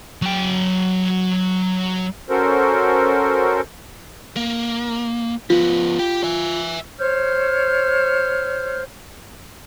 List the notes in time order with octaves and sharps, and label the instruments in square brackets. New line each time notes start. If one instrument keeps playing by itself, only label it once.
[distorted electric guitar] F#3 G5
[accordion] C#4 F#4 A4 A#4 C5
[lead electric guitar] A#3
[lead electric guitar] F3 B3 [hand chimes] F4
[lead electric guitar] G4 G5
E5 G#5
[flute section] C5 C#5 F6 G6